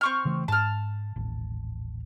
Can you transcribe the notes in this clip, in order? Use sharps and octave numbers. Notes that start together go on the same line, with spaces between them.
C4 C#6 F6
C#3 E3 A3
G#2 A5 F6
D#1 A1